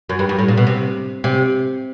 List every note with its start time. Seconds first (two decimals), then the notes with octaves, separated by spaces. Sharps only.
0.09 F#2
0.19 G2
0.29 G2
0.39 A2
0.48 A#2
0.57 B2
0.67 C3
1.24 C3